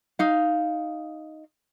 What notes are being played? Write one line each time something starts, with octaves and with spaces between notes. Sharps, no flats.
D#4 F5